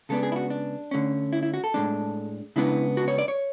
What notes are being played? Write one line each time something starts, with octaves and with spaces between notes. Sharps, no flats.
C#3 G#3 B3 D4 A4
G#4
E4
F#4
D4
D3 A3 C#4
E4
E4
F#4
A4
A2 G#3 D4
C#3 G#3 B3 D4 E4
F#4
C#5
D5
C#5